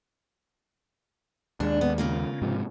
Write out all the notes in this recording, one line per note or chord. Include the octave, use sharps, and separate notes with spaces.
D#2 G#3 D4
B3
C#3 A#3 F4
G#2 C3 F3